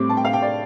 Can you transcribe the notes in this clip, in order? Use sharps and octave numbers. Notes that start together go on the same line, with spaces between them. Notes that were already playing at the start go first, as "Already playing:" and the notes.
Already playing: A2 G3 C4 D6
A5
G5
F5
G5
D5